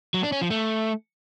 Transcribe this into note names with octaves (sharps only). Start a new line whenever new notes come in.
F#3
D4
C#4
F3
A3